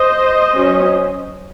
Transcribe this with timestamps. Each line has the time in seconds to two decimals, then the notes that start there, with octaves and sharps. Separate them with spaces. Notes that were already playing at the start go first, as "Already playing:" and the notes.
Already playing: C5 D#5
0.53 F#3 C#4